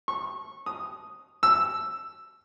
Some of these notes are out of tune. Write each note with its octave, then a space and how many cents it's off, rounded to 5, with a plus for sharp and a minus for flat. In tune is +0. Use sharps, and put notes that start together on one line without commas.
C#6 -20
D#6 +0
E6 +5